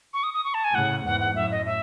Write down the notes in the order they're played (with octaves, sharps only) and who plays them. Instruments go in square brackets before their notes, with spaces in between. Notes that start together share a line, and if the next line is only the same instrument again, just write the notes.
[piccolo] C#6
D#6
D#6
C#6
A5
G#5
[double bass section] A2 C#3 [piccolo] F#5
[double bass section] E2 G#2 [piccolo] F#5
[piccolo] F#5
[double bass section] F#2 A2 [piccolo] E5
[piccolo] D#5
E5